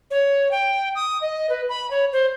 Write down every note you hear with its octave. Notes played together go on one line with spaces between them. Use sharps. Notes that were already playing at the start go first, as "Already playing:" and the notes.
C#5
G5
D#6
D#5
B4
B5
C#5
C5